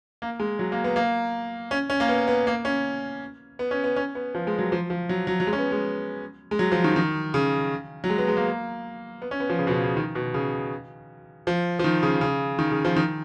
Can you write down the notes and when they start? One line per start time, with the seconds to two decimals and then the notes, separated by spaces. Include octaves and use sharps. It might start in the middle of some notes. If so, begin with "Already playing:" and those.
0.22 A#3
0.40 G#3
0.59 F#3
0.72 A#3
0.84 B3
0.96 A#3
1.71 C#4
1.90 C#4
2.00 A#3
2.09 B3
2.28 B3
2.47 A#3
2.65 C#4
3.59 B3
3.71 C#4
3.84 B3
3.96 C#4
4.15 B3
4.35 F3
4.47 G#3
4.59 F#3
4.72 F3
4.90 F3
5.09 F#3
5.27 F#3
5.40 F#3
5.47 G#3
5.53 C#4
5.59 B3
5.72 G#3
6.51 G#3
6.59 F#3
6.72 F3
6.84 D#3
6.96 D#3
7.34 C#3
8.04 F#3
8.10 G#3
8.18 B3
8.28 G#3
8.37 A#3
9.22 B3
9.31 C#4
9.40 B3
9.50 F3
9.59 C#3
9.67 B2
9.71 C#3
9.83 C#3
9.97 D#3
10.15 B2
10.34 C#3
11.47 F3
11.79 F3
11.84 D#3
12.03 C#3
12.21 C#3
12.59 D#3
12.71 C#3
12.85 F3
12.96 D#3